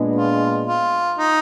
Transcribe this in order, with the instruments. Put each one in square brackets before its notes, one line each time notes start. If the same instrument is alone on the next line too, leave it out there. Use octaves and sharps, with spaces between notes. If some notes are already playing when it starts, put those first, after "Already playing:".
Already playing: [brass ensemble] A#2 G#3 B3 D4
[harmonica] F4
F4
D#4